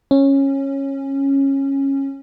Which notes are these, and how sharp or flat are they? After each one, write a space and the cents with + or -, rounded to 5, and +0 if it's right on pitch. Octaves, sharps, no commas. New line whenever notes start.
C#4 -15